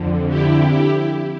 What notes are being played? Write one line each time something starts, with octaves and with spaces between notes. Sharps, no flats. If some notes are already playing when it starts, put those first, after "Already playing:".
Already playing: F2 D3
E4 G4